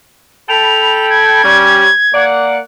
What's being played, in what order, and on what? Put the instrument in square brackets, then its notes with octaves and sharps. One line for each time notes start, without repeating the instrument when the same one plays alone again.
[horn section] A4 G5 B5 [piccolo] F7
[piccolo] G#6
[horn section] G3 C#4
A#3 D5 F#5